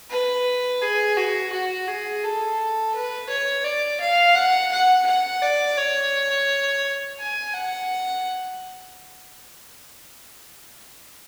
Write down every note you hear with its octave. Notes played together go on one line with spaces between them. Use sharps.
B4
G#4
F#4
F#4
G#4
A4
B4
C#5
D5
F5
F#5
F#5
F#5
D5
C#5
G#5
F#5